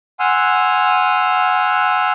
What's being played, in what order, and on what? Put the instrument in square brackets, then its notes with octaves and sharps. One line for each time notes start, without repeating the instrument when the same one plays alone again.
[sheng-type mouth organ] F#5 G#5 C6 E6 F6